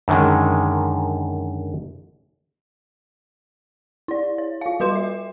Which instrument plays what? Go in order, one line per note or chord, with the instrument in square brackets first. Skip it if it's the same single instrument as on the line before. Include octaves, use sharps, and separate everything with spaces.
[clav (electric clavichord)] F#2 D3 D#3 G#3
[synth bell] E4 D5
C#5
F4 F5
G3 F#4 B4 C6 E7
E5